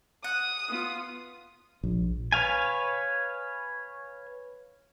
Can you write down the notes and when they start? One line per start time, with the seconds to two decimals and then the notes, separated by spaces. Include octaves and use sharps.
0.24 F#5 D#6
0.69 B3 F4
1.83 A#1
2.32 B4 C#5 F5 G#5